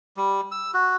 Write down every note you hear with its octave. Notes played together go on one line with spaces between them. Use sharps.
G3
E6
F#4